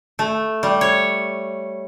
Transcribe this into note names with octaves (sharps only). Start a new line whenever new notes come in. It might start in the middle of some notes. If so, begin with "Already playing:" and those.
A3
G3
C#5